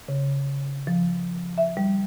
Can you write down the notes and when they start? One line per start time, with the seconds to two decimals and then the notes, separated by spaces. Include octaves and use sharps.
0.08 C#3
0.87 F3
1.58 E5
1.77 G3